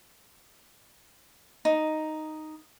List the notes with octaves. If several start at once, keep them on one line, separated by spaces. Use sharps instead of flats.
D#4